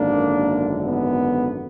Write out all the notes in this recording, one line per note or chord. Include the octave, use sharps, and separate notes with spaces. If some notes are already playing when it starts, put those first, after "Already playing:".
Already playing: G#1 F#2 D3 A#3 D4
B3